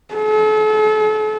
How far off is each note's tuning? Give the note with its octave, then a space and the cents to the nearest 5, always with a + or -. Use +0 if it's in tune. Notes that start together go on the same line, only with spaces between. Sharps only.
A4 -40